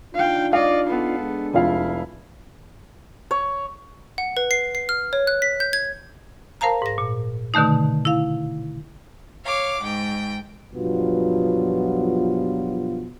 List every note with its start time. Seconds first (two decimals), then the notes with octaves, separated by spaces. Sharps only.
0.14 D4 D#4 F4 F5 G5
0.53 D5 D#5 F5
0.86 B3 A4
1.19 G#3 D4
1.53 F1 E4 F4 F5
3.31 C#5
4.18 F#5
4.37 B4
4.51 C7
4.75 C7
4.89 F6
5.13 C#5
5.27 F#6
5.42 B6
5.60 G6
5.73 G#6
6.61 A#4 C5 F5 A5 A#5
6.82 G#2 A#6
6.98 A#2
7.54 B2 D3 D#3 A3 D#4
8.05 E4 F5
9.45 C#5 F5 D6
9.82 G#2 G5
10.74 G2 B2 F3 F#3 B3 F4